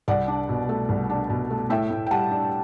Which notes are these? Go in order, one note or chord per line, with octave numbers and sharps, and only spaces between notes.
C2 D5 F#5
D4
B2
A3
C2
D4
B2
A3
A2 E5 G5
A2
G5
G3 F#5 A5
D4